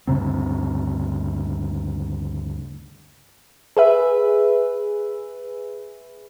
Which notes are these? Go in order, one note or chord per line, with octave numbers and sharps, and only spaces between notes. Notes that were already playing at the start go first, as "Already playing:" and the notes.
D2 G2 C#3 C4
G#4 B4 E5